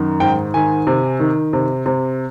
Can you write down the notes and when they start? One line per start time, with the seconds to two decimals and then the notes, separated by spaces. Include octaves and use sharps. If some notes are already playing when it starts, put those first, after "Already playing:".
Already playing: F#2 D#3
0.20 G#2 G5
0.54 D#3 G#5
0.87 C3
1.19 D#3
1.53 C3
1.86 C3